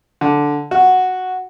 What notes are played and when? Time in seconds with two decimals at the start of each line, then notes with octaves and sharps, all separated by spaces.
0.21 D3
0.71 F#4